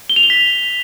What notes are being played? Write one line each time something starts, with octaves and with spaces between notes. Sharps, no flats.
G7
F7
G7
B6